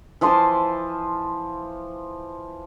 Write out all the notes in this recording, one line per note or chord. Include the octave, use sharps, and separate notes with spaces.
E3 F3 A5 C6